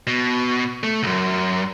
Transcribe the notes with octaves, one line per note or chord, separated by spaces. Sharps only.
B2
A3
C2 F#2